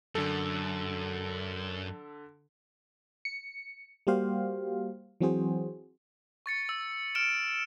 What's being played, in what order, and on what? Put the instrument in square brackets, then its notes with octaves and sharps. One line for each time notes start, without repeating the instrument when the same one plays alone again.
[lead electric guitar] F#2 [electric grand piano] D3 A4
[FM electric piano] C#7
G3 A#3 F#4 G4 C5 F5
E3 F#3 C4 F#4 G#4 C5
[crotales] C#6 A6 C#7
E6
F6 D7 E7